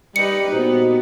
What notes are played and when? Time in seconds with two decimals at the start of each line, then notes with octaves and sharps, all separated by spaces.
0.16 G3 D#4 G4 B4 C#7
0.52 A#2 B3 D#4 F#4 C5